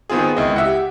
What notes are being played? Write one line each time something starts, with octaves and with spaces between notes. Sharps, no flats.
D#3 B3 C4 F4 G#4
C#2 E4 D#5
G4 E5 F#5